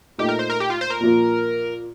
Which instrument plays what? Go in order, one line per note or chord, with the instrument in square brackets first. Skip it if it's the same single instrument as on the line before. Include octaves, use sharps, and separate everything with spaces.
[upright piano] A#2 A3 D#4 [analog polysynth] G4
[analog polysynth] A#4
C5
A#4
G4
F4
C5
A#4
[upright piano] A#2 F3 A#3 F4